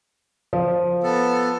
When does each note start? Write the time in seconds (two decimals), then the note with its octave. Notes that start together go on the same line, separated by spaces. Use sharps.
0.53 F3
1.03 B3 A4